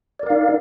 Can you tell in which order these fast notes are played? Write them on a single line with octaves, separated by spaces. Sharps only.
D5 A#4 F5 D#4